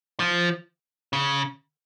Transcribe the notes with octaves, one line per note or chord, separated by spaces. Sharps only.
F3
C#3